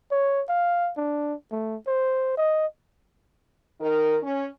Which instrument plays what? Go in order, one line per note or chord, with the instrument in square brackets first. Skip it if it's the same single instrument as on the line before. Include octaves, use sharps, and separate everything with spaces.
[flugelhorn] C#5
F5
D4
A3
C5
D#5
[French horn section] D#3 D#4 A#4
C#4